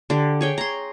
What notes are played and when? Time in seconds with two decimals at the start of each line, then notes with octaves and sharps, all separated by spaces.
0.10 D3 G4
0.41 G#4 C#5 G5
0.58 A#5 C6